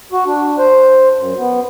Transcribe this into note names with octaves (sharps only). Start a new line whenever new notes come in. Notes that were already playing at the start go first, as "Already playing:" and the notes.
F#4
D4
C5
F#2
B3